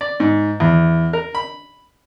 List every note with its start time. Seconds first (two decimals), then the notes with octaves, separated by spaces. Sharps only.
0.01 D5
0.20 G#2
0.60 E2
1.13 A#4
1.35 B5